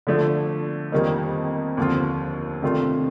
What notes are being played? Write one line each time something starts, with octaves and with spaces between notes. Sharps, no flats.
D3 F3 A3 D4
F2 D#3 G3 A#3 D#4
D#2 D3 F3 C4 F4
C3 D#3 A3 D4 F4